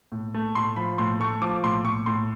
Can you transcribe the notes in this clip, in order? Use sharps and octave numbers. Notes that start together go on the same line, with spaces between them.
A2
A3
A2 C6
F3 B5
A2 C6
A3 C#6
F3 D6
A2 C6
A2 C#6
A2 C6